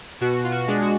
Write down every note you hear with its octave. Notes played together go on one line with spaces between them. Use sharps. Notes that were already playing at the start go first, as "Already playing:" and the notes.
B2 F#4
F4
F#4
G#3 D4
F#4